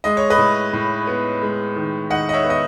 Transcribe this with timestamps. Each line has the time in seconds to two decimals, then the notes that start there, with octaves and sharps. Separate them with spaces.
0.04 G#3 D#5
0.17 C#5
0.30 B4 D#5
0.38 A2
0.73 A2
1.07 B3
1.42 G#3
1.76 D#3
2.10 D#3 D#5 F#5
2.29 D#5
2.34 C#5 E5
2.44 B3
2.50 D#5